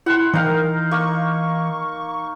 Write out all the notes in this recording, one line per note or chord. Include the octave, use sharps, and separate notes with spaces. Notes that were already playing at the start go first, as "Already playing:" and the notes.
E4 F#5 C6
E3 D#4 A#4 F5 G5
A#3 C#6